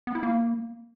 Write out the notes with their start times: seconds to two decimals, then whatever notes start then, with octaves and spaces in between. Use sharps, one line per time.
0.07 B3
0.15 E4
0.23 A#3